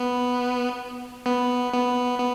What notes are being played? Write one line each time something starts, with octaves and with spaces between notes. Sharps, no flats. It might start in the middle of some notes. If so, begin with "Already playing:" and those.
Already playing: B3
B3
B3
B3